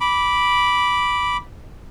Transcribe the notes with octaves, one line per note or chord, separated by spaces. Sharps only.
B5 D6